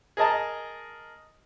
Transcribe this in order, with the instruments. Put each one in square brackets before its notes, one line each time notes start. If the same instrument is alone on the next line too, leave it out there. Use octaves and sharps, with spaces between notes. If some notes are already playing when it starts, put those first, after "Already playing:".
[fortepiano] G#4 A#4 D#5 A5 A#5